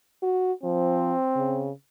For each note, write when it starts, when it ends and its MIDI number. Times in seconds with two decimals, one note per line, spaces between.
0.23 0.52 66
0.64 1.14 53
0.64 1.71 60
1.36 1.71 49